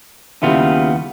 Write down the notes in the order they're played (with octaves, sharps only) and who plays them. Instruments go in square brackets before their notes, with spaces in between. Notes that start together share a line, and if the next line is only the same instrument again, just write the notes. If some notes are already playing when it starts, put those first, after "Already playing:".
[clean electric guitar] D#2 B3 F4 [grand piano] C#3 G3 E4